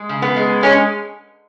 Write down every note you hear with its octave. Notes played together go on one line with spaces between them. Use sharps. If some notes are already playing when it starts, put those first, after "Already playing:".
Already playing: G#3
C#3
B3
G#3
G#3 C#4